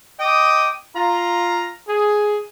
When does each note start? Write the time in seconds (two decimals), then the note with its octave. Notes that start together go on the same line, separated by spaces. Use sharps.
0.19 D#5 G5 D6 D#6
0.96 F4 A#5
1.88 G#4